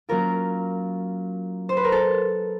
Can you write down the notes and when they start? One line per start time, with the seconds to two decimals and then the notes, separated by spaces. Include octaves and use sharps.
0.09 F#3 A#3 C#4 F4 A#4
1.69 C5
1.77 B4
1.84 A#4
1.92 A4